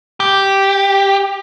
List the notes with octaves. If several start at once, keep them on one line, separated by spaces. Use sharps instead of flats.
G4